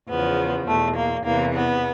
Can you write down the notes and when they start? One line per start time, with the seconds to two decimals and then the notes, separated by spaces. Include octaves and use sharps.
0.09 E2 C#3 F3 B3
0.68 E2 B2 A3
0.96 A#3
1.25 E2 C3 E3 A#3
1.54 B3